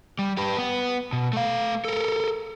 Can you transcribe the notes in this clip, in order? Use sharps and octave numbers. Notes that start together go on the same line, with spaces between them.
G3
G4 B4
B3
B2
A3 F5
A4 A#4